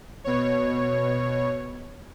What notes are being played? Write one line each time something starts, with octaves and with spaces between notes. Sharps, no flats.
B2 C#5